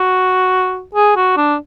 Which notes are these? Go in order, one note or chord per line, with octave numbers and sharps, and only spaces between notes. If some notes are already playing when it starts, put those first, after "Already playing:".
Already playing: F#4
G#4
F#4
D4